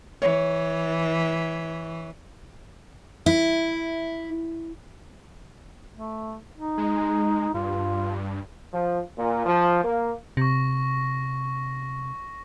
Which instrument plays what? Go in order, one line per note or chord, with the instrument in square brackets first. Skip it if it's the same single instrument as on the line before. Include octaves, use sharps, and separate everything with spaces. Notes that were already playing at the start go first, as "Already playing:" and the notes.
[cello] E3 [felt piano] C#5
[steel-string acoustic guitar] E4
[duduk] A3
D#4
[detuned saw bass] G#3
[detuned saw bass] G2 [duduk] F4
[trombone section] F3
A#2
F3
A#3
[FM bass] C3 [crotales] C#6 A#6